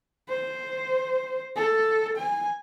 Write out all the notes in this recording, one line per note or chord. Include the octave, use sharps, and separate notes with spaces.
C5
A4
G#5